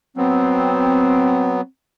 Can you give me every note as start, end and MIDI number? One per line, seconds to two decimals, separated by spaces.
0.17 1.61 54
0.17 1.61 59
0.17 1.63 60